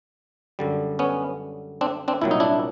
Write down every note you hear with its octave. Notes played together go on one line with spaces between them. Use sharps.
F#2 D3 G3
B3 C#4
C4 D4
C4 D4
C2 A#2 F#3 E4
D#4
D4 E4